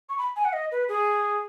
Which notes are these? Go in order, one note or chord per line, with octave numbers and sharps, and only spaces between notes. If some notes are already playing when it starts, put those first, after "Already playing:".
C#6
B5
G#5
F#5
D#5
B4
G#4